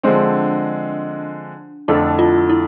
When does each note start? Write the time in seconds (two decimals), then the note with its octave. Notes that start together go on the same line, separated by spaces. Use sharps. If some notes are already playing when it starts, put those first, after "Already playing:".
0.03 D3 F3 G#3 C4 D4
1.88 F2 D3 A3 D4 E4 A4
2.19 F4
2.49 E4